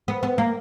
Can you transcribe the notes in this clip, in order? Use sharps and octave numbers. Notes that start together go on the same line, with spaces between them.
B3
B3
A#3